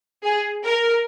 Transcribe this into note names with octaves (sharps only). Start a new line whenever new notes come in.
G#4
A#4